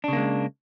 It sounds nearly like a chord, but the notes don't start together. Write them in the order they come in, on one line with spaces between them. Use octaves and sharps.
D4 C#3 A#3 G#3